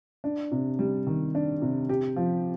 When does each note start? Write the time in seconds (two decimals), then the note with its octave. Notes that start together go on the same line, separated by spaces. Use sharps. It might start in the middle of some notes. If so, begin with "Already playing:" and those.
0.24 D4
0.52 C3
0.79 G3
1.07 D#3
1.35 D4
1.62 C3
1.89 G4
2.16 F3